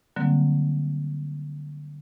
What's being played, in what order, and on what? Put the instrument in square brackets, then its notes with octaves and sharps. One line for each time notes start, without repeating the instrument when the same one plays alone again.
[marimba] D3 F#3 G3 A#3 C4